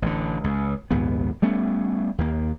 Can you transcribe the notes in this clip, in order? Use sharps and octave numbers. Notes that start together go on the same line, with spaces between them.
A1 D3
C#2
A#1 D#2 G#2 B3
G3 A3 B3 C#4
D#2 A#3